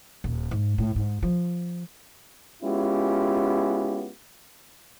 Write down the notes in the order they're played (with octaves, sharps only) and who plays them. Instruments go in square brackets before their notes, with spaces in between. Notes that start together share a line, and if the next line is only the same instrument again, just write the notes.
[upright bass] D#1
G#2
A2
G#2
F3
[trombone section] G#3 B3 C#4 E4 F4 G4